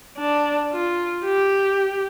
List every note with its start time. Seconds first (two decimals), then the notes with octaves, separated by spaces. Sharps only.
0.17 D4
0.72 F4
1.25 G4